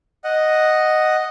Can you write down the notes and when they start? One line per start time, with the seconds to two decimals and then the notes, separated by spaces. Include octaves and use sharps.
0.24 D#5 F#5